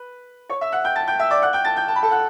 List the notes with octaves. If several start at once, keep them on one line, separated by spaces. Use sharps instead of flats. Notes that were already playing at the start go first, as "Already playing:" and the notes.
Already playing: B4
C#5 C#6
E5 E6
F#5 F#6
G5 G6
A5 A6
G5 G6
E5 E6
D5 D6
F#5 F#6
G5 G6
A5 A6
G5 G6
A5
B5
A4 A5
F#5 F#6